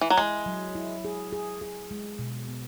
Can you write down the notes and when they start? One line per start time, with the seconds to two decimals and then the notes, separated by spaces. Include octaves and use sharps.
0.01 E3
0.10 F#3
0.17 G#3 E4
0.46 F#3
0.75 E4
1.05 G#4
1.33 G#4
1.61 G#4
1.91 G#3
2.19 B2
2.48 B3